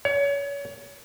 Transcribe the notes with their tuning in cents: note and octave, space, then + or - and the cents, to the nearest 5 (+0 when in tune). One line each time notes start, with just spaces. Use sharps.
C#5 +30